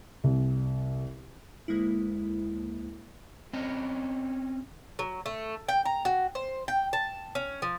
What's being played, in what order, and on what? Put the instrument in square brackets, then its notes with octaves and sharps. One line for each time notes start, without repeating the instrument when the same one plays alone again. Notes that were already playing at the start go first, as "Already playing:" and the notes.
[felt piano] C2
[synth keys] D2 G#3 A#3 E4
[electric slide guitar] C4 C#4 D#5
[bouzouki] F#3
A3
G5
A#5
F#4
C5
G5
A5
C#4
F3